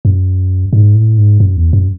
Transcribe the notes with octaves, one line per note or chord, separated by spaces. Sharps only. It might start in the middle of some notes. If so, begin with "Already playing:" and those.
F#2
G#2
A2
G#2
F#2
E2
F#2